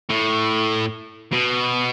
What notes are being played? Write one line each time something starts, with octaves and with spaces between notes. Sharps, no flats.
A2
B2